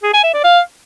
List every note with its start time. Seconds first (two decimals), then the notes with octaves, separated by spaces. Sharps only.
0.03 G#4
0.13 G#5
0.24 E5
0.34 D5
0.44 F5